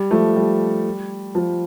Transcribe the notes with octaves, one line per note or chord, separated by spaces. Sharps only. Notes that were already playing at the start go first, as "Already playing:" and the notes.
Already playing: G3
F3 A3
G3
F3